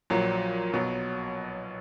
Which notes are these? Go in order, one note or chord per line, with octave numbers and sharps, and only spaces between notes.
A#1 A#2 F#3
B1 B2 F#3